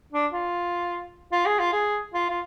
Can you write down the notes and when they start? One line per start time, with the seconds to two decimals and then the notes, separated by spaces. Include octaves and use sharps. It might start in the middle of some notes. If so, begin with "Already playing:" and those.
0.13 D4
0.33 F4
1.32 F4
1.46 G#4
1.59 F4
1.73 G#4
2.14 F4
2.30 F4